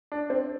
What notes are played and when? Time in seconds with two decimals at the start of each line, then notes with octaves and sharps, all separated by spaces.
0.12 D4
0.30 C4